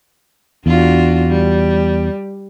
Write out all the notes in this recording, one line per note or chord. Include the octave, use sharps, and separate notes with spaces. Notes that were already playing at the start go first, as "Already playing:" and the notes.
E2 D4 F4 F#4
G3